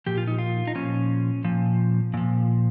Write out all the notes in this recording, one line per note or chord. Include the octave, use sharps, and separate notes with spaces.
A#2 F3 G4
F4
D#4
F4
D#4
A#2 F3 C#4
A#2 F3
A#2 F3